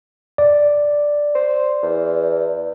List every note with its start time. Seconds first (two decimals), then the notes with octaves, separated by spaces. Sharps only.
0.38 D5
1.35 C5
1.83 E2